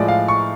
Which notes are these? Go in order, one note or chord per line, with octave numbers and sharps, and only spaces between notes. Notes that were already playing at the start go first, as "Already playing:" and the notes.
Already playing: A2 F3 G#3 D5
F5
C#6